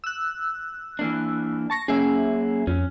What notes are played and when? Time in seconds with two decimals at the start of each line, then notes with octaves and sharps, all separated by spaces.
0.04 E6 F#6
0.99 E3 A#3 D4
1.70 A5 C#6 A#6
1.88 F#3 A#3 C#4 G#4 E5
2.67 F2 C#4